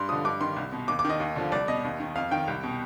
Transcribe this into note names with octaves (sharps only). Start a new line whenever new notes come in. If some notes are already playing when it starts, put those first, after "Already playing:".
Already playing: G2 C6
D3 F3 D#6
G2 D6
D#3 C6
C2
B2
D#2 D6
D6
D#3 D#5
D#2
D3 F3
C2 D5
B2 D#5
D#2
D#3
F2 F5
D#3 G5
C2
B2